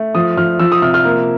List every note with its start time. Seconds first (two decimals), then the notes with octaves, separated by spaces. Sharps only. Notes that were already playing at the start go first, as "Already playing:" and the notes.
Already playing: A3
0.15 F3 D#6
0.37 F3 F6
0.60 F3 E6
0.72 D#6
0.82 C3 F6
0.94 F6
1.05 A#3